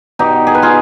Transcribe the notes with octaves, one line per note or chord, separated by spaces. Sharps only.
B2 D#4 G4
G#4
B4
F4 G#4